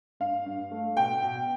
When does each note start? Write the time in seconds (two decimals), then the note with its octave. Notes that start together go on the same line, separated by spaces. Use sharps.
0.20 G2 F5
0.46 G2
0.71 A3
0.97 B2 G5
1.22 B2